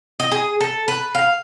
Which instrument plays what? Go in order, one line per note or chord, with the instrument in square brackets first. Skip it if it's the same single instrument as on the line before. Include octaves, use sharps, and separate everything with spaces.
[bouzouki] D#5
G#4
A4
B4
F5